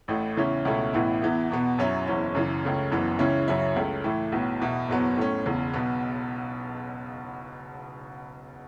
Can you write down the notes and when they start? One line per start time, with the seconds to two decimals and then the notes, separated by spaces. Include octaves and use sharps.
0.08 A1 A2 A3
0.37 E2 C#3 E3 C#4 E4
0.65 C#2 B2 A3 C#4 E4
0.93 A1 A2 E3 B3 E4
1.21 E2 E3 B3 E4
1.50 E2 B2 B3
1.78 F#2 F#3 C#4 E4
2.06 F#1 E2 E3 C#4 E4
2.35 F#2 C#3 E3
2.63 C#2 C#3 A3 C#4
2.91 F#1 F#2 E3 B3
3.19 C#2 C#3 E3 C#4 E4
3.48 F#2 C#3 F#3 C#4 E4
3.76 C#2 C#3 A3
4.04 A2 E3 A3 E4
4.32 B1 A2 F#3 B3
4.60 E2 B2 B3 E4
4.89 F#1 E2 B2 F#3 B3
5.17 A2 A3 C#4
5.46 E1 E2 C#3
5.74 B1 B2 B3